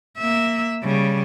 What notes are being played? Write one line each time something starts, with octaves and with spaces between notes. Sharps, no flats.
A#3 E5
C#3 G3